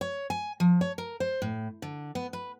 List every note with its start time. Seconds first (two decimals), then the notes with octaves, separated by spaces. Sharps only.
0.01 C#5
0.30 G#5
0.60 F3
0.81 C#5
0.98 A#4
1.20 C5
1.42 A2
1.82 D3
2.15 B3
2.33 B4